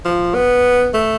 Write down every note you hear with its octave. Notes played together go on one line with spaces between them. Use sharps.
F3
B3
A3